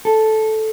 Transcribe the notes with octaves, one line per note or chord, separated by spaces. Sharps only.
A4